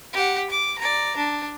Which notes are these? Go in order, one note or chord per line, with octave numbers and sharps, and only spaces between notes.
G4 F#5
D6
D5 A#5
D4